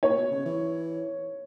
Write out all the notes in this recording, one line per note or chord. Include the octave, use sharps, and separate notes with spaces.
A#2 C#5
B2
C#3
E3